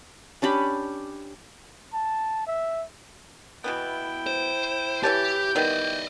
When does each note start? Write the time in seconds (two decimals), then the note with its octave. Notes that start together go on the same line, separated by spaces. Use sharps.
0.42 C#4 D4 G4 B5
1.93 A5
2.47 E5
3.64 B2 E3 B3 E4 G5
4.27 C5
5.03 E3 G4 C#5 A5 G6
5.56 D#3 G3 B3 D5 D#5